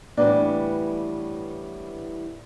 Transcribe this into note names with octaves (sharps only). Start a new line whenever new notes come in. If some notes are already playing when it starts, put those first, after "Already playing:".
A2 E3 G3 A#3 B3 D4